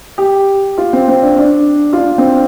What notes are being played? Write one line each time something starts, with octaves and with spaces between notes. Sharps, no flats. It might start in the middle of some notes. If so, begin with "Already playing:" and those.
G4
F4
C4
C4
D4
D4
F4
D4
C4